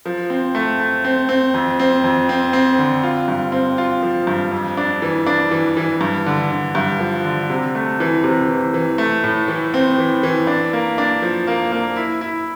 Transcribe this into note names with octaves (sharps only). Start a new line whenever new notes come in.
F3
C4
A3
A3
C4
C4
F2
C4
F2
C4
C4
D3
F4
G2
C4
F4
F3
G2
F2
D4
E3
D4
E3
E3
G2
D3
D3
G2
F3
D3
C3
A3
E3
C3
E3
E3
A3
A2
E3
C4
E3
E3
D4
A#3
D4
F3
A#3
A#3
E4
E4